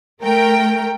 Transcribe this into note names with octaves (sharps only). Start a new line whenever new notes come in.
A3 A#4 G5